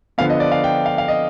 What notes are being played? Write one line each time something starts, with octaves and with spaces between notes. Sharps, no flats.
D3 F3 B3 F5
D#5
D5
F5
G5
F5
F5
D#5